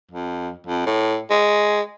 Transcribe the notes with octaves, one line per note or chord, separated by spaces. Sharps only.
F2
F2
A2
G#3